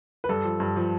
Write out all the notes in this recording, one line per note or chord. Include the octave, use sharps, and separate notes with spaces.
B4
G2 A4
F3
G2
F3